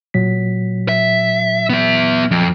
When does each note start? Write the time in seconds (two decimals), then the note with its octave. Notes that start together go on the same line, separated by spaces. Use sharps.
0.14 A#2 F#3 B6
0.89 E5
1.70 B3 E5
2.31 F2